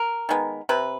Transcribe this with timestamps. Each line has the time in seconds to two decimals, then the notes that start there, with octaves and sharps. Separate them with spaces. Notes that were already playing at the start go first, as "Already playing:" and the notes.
Already playing: A#4
0.29 D#3 G#3 B3
0.69 C3 B4